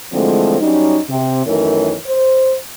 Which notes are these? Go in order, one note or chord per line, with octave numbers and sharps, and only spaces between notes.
D3 E3 F3 G#3 A3 C4
F#3 G3 C#4 D#4
C3
F#2 D#3 E3 A3 A#4 C#5
C5